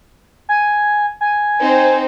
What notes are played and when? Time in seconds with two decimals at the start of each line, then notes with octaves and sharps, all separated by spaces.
0.49 G#5
1.21 G#5
1.62 C4 D#4 C5